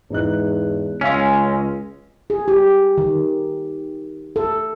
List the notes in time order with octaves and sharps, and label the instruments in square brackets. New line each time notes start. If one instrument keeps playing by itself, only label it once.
[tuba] E2 [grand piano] G#2 D#4 F#6
[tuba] C#2 [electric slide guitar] G#3 C#4 [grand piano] F5 E6
[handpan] G#4
G4
D#3
A4